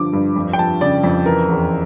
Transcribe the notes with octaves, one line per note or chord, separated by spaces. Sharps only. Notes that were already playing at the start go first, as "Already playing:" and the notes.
Already playing: G2 D3 F3 D6
G2
F2
G5
F3 A5
C#3 D5
F2
E3 A#4
E2